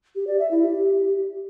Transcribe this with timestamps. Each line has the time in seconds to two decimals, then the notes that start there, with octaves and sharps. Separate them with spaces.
0.16 G4
0.27 D5
0.39 E5
0.51 E4
0.63 G4